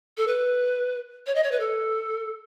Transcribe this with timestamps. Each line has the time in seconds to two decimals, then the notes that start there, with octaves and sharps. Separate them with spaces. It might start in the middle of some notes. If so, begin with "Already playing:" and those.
0.17 A4
0.27 B4
1.26 C#5
1.35 D#5
1.43 C#5
1.51 B4
1.59 A4